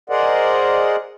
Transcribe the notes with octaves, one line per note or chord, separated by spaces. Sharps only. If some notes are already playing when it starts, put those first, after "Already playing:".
G#4 A#4 C5 D5 D#5 F#5